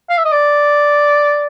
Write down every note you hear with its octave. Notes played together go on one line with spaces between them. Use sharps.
F5
E5
D#5
D5